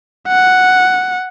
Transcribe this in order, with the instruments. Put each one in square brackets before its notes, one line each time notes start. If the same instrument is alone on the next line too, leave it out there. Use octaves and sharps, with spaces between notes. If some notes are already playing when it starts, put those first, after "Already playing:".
[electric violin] F#5